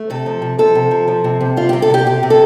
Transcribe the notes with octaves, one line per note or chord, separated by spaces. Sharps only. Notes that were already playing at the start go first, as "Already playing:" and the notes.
Already playing: A3
C3 A4
F3
C3
F3 A4
C3
F3
F3
C3
C3
G3 F4
C3 G4
A4
C3 G4
C3 G4
C3
A4